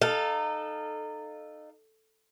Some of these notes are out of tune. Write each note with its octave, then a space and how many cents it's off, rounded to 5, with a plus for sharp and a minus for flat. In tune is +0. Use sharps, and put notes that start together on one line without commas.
D#4 -25 A4 +0 F5 +0